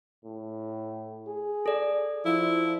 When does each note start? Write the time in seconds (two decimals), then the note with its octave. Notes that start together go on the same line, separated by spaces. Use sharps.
0.24 A2
1.27 G#4
1.66 A4 D5
2.25 F3 E4